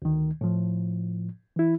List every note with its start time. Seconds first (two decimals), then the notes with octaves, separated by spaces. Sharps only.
0.02 D2 D#3
0.41 A2 F3
1.56 E3 E4